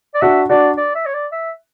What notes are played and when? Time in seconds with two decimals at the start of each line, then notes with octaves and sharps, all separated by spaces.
0.15 D5
0.22 D4 F#4 E5
0.49 D4 F#4 D5
0.77 D5
0.95 E5
1.06 C#5
1.14 D5
1.32 E5